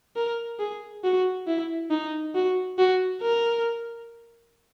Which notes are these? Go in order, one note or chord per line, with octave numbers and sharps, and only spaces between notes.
A#4
G#4
F#4
E4
D#4
F#4
F#4
A#4